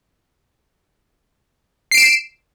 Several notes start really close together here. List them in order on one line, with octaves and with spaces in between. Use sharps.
C7 D7 E7